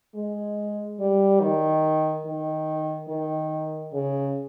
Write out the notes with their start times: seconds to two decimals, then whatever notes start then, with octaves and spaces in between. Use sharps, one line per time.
0.15 G#3
0.99 G3
1.40 D#3
2.25 D#3
3.08 D#3
3.93 C#3